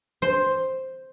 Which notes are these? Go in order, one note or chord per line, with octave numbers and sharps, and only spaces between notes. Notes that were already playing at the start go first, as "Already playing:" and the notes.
C5